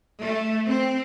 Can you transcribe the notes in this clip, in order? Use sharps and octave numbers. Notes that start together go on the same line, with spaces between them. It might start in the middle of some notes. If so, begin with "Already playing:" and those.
A3
C4